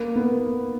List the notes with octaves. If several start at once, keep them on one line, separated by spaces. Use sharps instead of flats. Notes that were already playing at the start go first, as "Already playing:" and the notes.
Already playing: A#3
B3